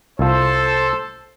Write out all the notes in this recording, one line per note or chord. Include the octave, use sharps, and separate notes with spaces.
C2 F4 A4 C5